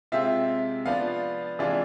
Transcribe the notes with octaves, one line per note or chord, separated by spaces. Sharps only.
C3 G#3 C4 F4 E5
F3 B3 D4 F4 F5
C3 E3 G#3 D4 F4